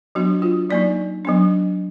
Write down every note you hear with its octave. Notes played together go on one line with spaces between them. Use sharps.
F#3 B3 D4 F#4
F4
F#3 A#3 D#4 D5
F#3 B3 D4